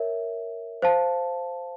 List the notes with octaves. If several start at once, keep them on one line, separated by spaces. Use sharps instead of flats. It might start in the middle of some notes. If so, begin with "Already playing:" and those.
Already playing: A#4 C#5 E5
C5 F5 A5